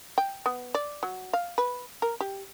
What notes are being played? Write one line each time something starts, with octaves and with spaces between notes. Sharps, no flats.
G5
B3
D5
F#3
F5
B4
A#4
G4